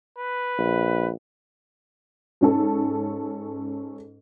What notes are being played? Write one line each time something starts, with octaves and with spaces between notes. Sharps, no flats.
B4
A#1
G#2 C#4 A4